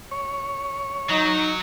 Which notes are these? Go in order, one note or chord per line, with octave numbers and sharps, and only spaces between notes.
C#5
F#3 D#4